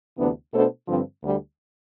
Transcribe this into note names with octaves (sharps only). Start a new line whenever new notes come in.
D2 C3 E3 B3 D4
B2 A3 D4 A4 C5
G2 D3 F3 C4
D2 D3 G3